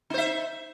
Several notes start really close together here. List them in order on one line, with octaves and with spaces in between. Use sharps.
D#4 C5 E5